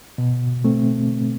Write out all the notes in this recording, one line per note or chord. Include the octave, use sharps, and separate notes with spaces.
B2
A3 C4